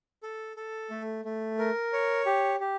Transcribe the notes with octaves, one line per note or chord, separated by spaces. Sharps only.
A4
A4
A3
A3
A#4
C#5
G4
G4